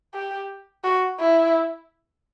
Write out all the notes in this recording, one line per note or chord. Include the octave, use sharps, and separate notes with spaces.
G4
F#4
E4